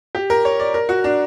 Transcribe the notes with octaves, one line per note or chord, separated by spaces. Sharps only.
G4
A#4
C#5
D5
A#4
F#4
D4